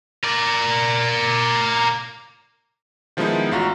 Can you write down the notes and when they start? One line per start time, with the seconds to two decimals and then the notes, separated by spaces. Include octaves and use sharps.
0.24 A#4 D5
3.17 D#3 F3 G#3 B3 D#4 E4
3.52 A1 F4 F#4 A#5